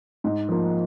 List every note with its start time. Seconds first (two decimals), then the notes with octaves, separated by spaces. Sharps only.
0.24 G#2
0.49 F3 A#3